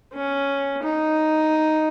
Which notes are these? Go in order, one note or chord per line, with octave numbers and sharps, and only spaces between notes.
C#4
D#4